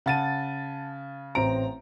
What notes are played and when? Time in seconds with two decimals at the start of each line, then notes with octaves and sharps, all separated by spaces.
0.06 C#3 F#5 A5 A6 D#7
1.35 A1 C4 A#5 D7